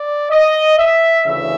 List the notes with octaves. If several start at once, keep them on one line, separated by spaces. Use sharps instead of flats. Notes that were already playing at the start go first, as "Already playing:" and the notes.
Already playing: D5
D#5
E5
D2 C#3 E3 E5